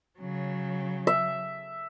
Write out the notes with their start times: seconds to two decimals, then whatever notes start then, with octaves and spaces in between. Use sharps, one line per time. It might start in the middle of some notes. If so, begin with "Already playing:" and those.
0.19 C#3 F#3
1.07 E5